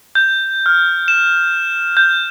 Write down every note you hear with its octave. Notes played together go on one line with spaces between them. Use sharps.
G6
F6
E7
G6